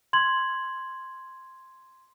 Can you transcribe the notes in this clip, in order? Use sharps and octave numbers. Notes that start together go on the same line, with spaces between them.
C6 G#6 F#7